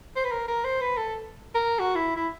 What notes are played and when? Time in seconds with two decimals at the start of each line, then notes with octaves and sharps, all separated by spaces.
0.16 C5
0.25 B4
0.32 A#4
0.48 A#4
0.64 C5
0.81 B4
0.97 A4
1.55 A#4
1.79 F#4
1.95 E4
2.16 E4